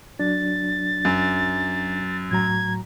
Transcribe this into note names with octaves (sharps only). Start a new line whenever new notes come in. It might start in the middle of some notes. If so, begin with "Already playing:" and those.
F#3 D4 A6
F#2
A2 F#3 A#5 G#6